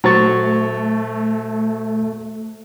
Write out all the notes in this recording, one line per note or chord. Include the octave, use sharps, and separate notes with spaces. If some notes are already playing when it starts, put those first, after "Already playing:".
A#2 F#3 A3 C5 C#6 A6